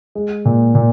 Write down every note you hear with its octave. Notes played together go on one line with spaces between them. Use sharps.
G#3
A#2
A#2